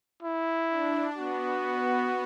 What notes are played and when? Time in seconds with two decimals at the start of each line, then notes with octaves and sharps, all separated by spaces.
0.23 E4
0.70 D4
1.17 B3 F#4
1.64 B3